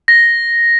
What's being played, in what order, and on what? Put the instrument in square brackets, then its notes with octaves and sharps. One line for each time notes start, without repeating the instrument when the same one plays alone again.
[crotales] A#6